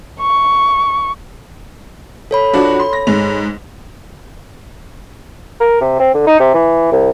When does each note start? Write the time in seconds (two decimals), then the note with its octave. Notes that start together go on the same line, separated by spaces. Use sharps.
0.21 C#6
2.31 A4 C#5 B5
2.53 F3 D4 F#4
2.80 C6
2.93 A#6
3.07 G#2 F7
5.60 A#4
5.81 C3
6.00 C4
6.14 D3
6.27 D#4
6.40 C3
6.54 E3
6.92 C2